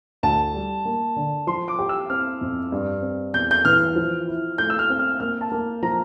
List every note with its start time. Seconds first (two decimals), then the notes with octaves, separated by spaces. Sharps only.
0.23 D2 A5
0.55 G3
0.85 A#3
1.16 D3
1.47 F3 C6
1.68 D6
1.79 G4
1.89 E6
2.10 C4 F6
2.41 F2
2.72 G2
3.02 C4
3.34 E2 G6
3.51 G6
3.65 E3 F6
3.96 F3
4.28 E4
4.58 A3 G6
4.70 E6
4.79 F6
4.90 C4
4.99 F6
5.20 A#3 F6
5.41 A5
5.52 A#3
5.82 F3 A#5